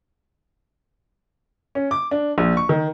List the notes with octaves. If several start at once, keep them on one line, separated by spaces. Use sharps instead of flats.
C#4
D6
D4
A#1
C#6
D#3